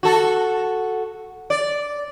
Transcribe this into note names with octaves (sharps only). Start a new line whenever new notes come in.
F#4 A4
D5